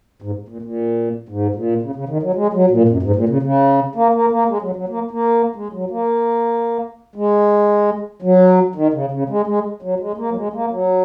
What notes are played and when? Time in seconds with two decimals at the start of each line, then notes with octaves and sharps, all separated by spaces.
0.22 G#2
0.49 A#2
0.62 A#2
1.29 G#2
1.55 A#2
1.82 C#3
1.95 C#3
2.09 D#3
2.23 F#3
2.35 G#3
2.53 F#3
2.70 A#2
2.89 F#2
3.03 G#2
3.16 A#2
3.29 C#3
3.43 C#3
3.95 A#3
4.14 A#3
4.31 A#3
4.49 G#3
4.62 F#3
4.76 F#3
4.89 A#3
5.11 A#3
5.56 G#3
5.73 F#3
5.91 A#3
7.16 G#3
8.22 F#3
8.75 D#3
8.93 C#3
9.11 C#3
9.29 G#3
9.47 G#3
9.82 F#3
10.00 G#3
10.17 A#3
10.31 F#3
10.36 G#3
10.53 A#3
10.71 F#3